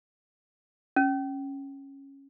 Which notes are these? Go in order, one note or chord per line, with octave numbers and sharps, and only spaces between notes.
C#4